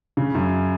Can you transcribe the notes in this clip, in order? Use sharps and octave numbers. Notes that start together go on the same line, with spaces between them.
C#3
F#2